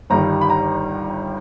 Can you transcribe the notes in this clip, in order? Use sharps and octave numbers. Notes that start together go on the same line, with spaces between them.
G1 G2 D#3 G3 A#5
B5
A#5